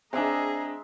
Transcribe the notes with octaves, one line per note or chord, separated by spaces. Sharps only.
G#3 C4 D4 G#4 D#5 E5 A#5